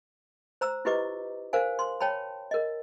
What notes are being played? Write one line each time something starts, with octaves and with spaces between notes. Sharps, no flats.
C5 A#5 E6
E4 F4 G4 B4 D#5 D6
A#4 C5 F5 G#5
C6
C#5 G5 A5 B5
A#4 D#5